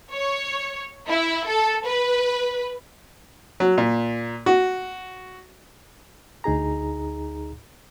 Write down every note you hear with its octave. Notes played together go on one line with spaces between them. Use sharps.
C#5
E4
A4
B4
F#3
A#2
F#4
D2 D#4 G#4 A#5